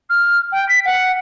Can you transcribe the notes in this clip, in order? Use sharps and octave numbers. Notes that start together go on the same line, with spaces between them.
F6
G5
B6
F#5